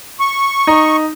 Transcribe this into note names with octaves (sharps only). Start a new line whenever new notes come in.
C#6
D#4